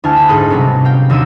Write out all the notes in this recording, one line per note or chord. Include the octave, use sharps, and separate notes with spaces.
D2 E4 G#5 A5 F6
B5
G#2 D#4 G#4 A4 D#6 F#6
C3 F#3 G3 B3 C#4
F5 G5
D#2 D3 F#4 E6 D#7 E7